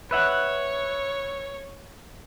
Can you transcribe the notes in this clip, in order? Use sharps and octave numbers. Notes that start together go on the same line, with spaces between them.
B4 C#5 E5 F#5